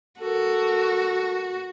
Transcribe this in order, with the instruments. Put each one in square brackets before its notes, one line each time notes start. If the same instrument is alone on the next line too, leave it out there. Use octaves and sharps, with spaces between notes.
[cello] F#4 [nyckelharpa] A4 A#4